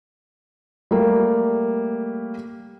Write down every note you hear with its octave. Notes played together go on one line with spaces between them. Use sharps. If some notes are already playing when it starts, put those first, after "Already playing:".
G3 A3 A#3